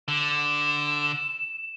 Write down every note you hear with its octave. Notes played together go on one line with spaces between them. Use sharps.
D3 E7